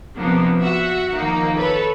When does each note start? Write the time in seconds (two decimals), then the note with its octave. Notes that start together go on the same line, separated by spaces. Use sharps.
0.15 C3 F3 A#3 B3 D4
0.59 F#4 E5 F#5
1.13 D#3 F3 A#3 D#4
1.57 A4 B4 C#5